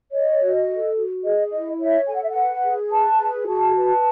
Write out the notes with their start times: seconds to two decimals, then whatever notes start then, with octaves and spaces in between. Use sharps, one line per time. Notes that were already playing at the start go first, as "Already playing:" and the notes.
0.12 C#5 D#5
0.40 F#4
0.67 A4
0.96 F#4
1.24 G#4 D#5
1.51 E4 D#5
1.79 C#5 E5
2.07 A4 G#5
2.14 F#5
2.22 E5
2.29 F#5
2.35 B4
2.63 G#4
2.91 B4 A5
3.18 G#4
3.47 F#4 A5
3.75 B4